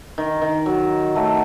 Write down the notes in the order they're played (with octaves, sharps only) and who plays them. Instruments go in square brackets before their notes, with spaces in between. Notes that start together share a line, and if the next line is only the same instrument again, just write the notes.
[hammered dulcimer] D#3
D#3
F#3
F#3 A3